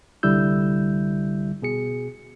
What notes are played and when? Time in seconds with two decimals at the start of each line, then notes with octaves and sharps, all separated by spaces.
0.23 C2 D3 G3 E4 E6 G6
1.62 B2 G#4 C#7